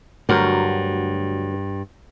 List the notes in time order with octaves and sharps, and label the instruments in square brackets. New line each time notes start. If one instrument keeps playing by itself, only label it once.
[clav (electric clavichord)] D2 F#3 A#4 [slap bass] G2